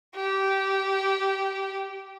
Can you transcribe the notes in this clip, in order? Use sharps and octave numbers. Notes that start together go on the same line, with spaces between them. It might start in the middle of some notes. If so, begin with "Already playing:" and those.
G4